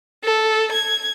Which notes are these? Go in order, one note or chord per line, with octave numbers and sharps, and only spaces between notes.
A4
G#6